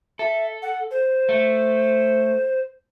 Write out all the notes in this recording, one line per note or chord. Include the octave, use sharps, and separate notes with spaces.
A4 E5
F#5
C5
A3